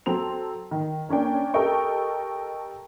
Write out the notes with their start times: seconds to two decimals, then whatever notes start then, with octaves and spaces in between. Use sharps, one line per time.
0.06 F#3 C4 A4 C6 F7
0.71 D#3
1.09 A#3 C#4 D4 G5
1.54 G4 A4 A#4 D#5 G5 C#6